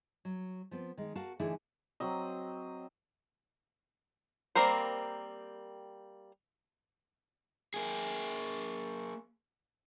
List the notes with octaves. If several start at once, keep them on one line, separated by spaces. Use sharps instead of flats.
F#3
F3 B3 C4
D#3 G#3
F#4 A#4 F5 A5
D3 E3 A3 D#4 E4 G#4
F#3 C4 D#5
G3 A#3 C4 A#4 C5
A#3 G#4